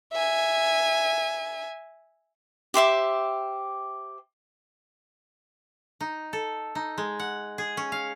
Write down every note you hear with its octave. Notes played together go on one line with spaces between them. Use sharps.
E5 G#5
G4 C5 E5 D6
D#4
A4
D#4
G#3
F#5
G#4
C#4
F5